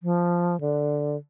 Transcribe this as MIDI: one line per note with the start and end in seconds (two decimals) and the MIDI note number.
0.03 0.60 53
0.61 1.16 50